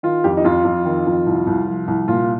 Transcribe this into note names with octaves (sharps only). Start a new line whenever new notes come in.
D#3 F4
F2 G4
D#4
F2 F4
F2
D#3
F2
C2
C2
F3
C2
A#2 F4